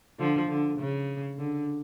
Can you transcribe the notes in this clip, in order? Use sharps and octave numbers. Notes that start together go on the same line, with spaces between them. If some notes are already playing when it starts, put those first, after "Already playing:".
D3 F3
D3
C#3
D3